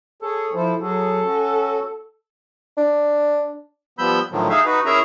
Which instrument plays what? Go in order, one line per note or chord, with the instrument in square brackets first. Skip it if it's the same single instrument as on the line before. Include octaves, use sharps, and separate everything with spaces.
[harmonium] G#4 C#5 [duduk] A4
[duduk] F3 [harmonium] E4 A4 C5
[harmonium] F#3 F#4 G#4 [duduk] A4
[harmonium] C#4 F#4
[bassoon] D4
[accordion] F3 G3 B3 B5 E6 G6
A2 D3 D#3 F3 F#3
D#4 G#4 E5 F5
D#4 F#4 B4
C#4 E4 G#4 A#4 E5 A#5